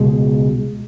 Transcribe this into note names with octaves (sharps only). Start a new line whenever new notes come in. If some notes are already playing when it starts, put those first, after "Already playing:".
Already playing: C#2 B2 G#3